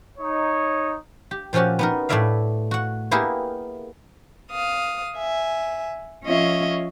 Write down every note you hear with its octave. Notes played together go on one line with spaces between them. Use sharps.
D#4 C#5
G4
A#2 F3 C#4 F#4 G4
B3 D#4 A#4
A2 A3 E4 D5 E5 F5
F#4 F#5
A#3 B3 E4 G4 G#4 A#4
F5 D#6
E5 G#5
F3 C#4 F4 C#5 D#5 E5